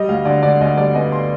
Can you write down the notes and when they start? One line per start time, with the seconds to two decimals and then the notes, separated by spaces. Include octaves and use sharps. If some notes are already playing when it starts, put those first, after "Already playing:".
Already playing: G3 D#5
0.09 D2 F5
0.25 D3 D5
0.43 D3 D5
0.60 D2 D#5
0.77 G3 D5
0.95 B3 D#5
1.12 C6